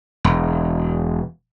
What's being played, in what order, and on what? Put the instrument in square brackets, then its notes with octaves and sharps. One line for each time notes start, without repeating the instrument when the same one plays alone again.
[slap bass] E1